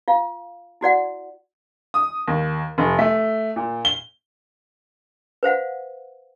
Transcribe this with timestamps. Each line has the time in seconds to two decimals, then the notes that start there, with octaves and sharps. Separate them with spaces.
0.08 F4 F5
0.81 E4 F#4 D5 F#5
1.94 D#6
2.28 D#2
2.78 F1
2.99 A3
3.56 A#2
3.85 G7
5.43 B4 C5 F5 F#5